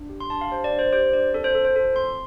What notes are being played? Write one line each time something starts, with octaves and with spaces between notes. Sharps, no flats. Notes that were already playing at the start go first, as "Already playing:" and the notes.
Already playing: D4
G4
C6
D4 A5
F5
G4 C5
D5
D4
C5
G4 C5
D4 D5
C4 A4
C5
A4
C5
F4 A4
C4 C6